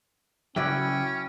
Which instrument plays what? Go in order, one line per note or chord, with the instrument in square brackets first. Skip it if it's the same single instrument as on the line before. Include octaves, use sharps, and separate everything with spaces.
[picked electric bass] C#3 F#3 [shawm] C#4 [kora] E4 F#4 D5 [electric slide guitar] G5